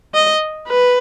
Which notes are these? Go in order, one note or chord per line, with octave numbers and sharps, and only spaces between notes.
D#5
B4